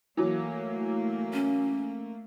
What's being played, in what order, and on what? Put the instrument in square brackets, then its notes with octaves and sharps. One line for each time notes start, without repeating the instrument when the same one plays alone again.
[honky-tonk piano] E3 F#3 [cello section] A3 A#3
[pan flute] C#4